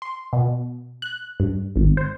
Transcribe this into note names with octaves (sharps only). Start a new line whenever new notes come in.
C6
B2
F#6
G2
G#1
C5